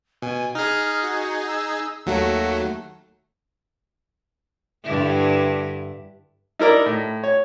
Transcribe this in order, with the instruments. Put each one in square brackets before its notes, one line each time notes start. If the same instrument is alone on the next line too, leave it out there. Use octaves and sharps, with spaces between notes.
[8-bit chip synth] B2 [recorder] G#5
[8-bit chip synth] D#4 G#4 [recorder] F6
[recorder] F#4
E6
[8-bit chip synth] D#2 F#3 A3 [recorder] F#4
[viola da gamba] G2 D3 E4
[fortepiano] D#4 E4 A#4 D5
A2
C#5